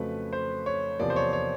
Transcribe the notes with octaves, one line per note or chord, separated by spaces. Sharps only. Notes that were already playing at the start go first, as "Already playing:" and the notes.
Already playing: F2 C#3 F#3 A3 B4
C5
C#5
E2 C3 F3 A#3 D5
C5
C#5
C#5